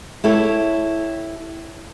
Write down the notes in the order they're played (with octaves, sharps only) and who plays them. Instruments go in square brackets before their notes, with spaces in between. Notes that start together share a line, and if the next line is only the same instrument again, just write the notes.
[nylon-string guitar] E4 G4 A4 C#5